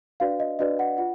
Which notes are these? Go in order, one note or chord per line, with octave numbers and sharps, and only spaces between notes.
D4 F#4 B4 D5 F5
D#5
D4 F#4 B4 D5 D#5
F#5
F4 F#5